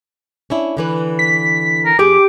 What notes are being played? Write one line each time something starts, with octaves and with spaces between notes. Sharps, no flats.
C#4 D4 E4
D3 E3 B4
B6
A#4
F2 G4 G#4 D6